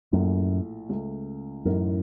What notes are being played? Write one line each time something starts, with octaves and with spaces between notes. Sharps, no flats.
A#1 F#2 A2 A3
C#2 C#3 A3
A1 F#2 A2 A3 D#4 A#4